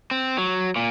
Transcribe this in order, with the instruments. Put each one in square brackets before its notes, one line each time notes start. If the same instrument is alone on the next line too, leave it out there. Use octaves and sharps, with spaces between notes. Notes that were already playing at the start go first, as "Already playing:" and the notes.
[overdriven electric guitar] C4
F#3
A#2